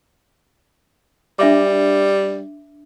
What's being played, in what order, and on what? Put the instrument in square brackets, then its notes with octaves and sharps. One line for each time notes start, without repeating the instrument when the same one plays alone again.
[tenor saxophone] G3 [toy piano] D4 E5 D6